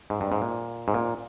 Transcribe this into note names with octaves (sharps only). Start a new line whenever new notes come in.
G#2
G2
G#2
A#2
G#2
A#2